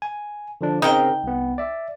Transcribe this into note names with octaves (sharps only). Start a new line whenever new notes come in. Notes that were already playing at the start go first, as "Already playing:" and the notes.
G#5
D3 F3 D4
C#3 C4 D#4 A#4 G5
C2 B3
D5 E5